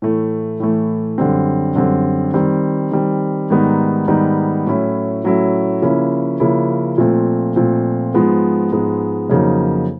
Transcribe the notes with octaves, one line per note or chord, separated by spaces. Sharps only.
A2 E3 A3
A2 E3 A3
F#2 D3 G3 C4
F#2 D3 G3 C4
D#3 G3 C4
D#3 G3 C4
G#2 D#3 G3 B3 D#4
G#2 D#3 G3 B3 D#4
A2 F#3 A3 C#4 E4
A2 F#3 A3 C#4 E4
C#3 F3 A#3 C#4 E4
C#3 F3 A#3 C#4 E4
A#2 F3 A3 C4
A#2 F3 A3 C4
G#2 F3 G#3 B3
G#2 F3 G#3 B3
F2 C#3 F#3 A#3 D#4